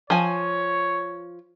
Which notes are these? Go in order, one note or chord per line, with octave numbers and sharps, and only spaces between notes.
F3 C#5 G#5